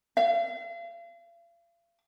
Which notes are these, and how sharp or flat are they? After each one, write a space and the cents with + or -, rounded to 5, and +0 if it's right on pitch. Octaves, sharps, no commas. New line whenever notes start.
F5 -40